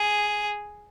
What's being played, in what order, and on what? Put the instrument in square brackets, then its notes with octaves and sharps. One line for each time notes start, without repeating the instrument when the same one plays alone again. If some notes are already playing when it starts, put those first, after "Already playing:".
Already playing: [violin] G#4